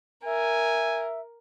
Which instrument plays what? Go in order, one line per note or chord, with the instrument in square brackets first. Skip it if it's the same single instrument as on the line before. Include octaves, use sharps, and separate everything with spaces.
[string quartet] A#4 [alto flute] E5 [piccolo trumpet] G#5